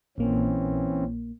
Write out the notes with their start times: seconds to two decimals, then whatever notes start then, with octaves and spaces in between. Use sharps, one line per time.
0.18 A#1 A#2 E3 A#3 C4 C#4